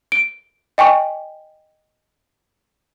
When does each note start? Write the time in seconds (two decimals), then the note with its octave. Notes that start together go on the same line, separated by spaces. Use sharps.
0.12 D7
0.78 D#5 G5 G#5 C#6